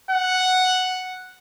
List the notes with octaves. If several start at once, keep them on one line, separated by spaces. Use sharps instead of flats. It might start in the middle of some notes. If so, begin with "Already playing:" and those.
F#5